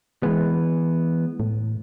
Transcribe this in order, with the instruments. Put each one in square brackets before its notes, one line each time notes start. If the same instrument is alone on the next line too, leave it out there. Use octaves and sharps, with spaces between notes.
[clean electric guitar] E3 B3 [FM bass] G#3
[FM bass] A2